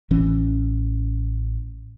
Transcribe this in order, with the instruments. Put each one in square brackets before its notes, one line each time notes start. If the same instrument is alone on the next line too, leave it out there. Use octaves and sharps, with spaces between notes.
[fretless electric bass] A1 E3 C#4